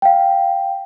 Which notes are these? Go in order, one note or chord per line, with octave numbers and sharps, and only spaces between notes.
F5 G5